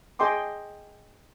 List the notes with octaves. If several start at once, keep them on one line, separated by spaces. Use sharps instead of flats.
G#4 D#5 G5 C6 D6